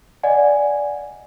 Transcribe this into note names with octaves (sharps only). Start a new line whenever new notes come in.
D5 D#5 F#5 G#5